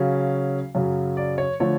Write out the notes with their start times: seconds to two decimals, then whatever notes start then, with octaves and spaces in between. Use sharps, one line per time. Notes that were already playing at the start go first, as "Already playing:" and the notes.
Already playing: C#3 F#3 C#4 F5
0.75 F#2 C#3 F#3
1.17 D5
1.38 C#5
1.60 D3 F3 A3 C#5